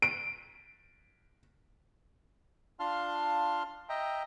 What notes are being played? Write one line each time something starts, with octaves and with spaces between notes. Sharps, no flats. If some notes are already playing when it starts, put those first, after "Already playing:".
D7
D4 F4 F5 A5 C6 F6
D#5 E5 G5 A#5